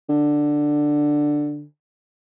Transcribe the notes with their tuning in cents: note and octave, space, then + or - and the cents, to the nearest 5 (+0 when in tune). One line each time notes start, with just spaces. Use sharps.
D3 +5